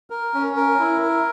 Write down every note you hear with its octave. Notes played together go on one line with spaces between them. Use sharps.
A#4
C#4
A#4
E4
A#4